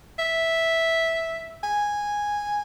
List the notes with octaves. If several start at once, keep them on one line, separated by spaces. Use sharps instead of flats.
E5
G#5